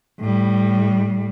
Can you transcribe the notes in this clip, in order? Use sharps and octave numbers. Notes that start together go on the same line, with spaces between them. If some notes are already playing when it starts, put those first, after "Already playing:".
A2 G3